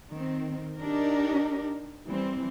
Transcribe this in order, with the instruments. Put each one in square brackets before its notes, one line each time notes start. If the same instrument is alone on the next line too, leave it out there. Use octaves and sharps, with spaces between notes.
[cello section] D#3 C4
D4 D#4 G4 A#4
E3 G3 C4